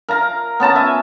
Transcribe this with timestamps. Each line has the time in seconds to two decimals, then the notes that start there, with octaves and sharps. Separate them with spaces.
0.09 A#4 F5 A#5
0.60 B3 C#4 A5 A#5
0.76 E5 G#5